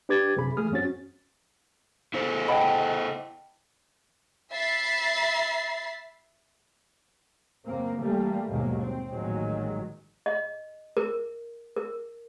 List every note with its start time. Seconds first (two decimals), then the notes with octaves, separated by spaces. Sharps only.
0.09 D4 G4 B4 D6 G#6 A6
0.36 F#2 C3 G#4 B5
0.57 E3 A3 G#4 D#6 F6
0.72 F#2 C4 C#4 F#4 A6
2.14 E4 A4 C5
2.48 D#5 F#5 G5 A5 B5
4.51 E5 B5 A6 C7
7.65 F#2 C#3 A#3 C4
8.00 E3 G3 A3 A#3
8.49 D#2 G#2 B2 F#3 G#3 A#3
8.81 C4
9.11 A1 A#2 D#3 F#3 G#3
10.26 D#5
10.97 A#4
11.76 A#4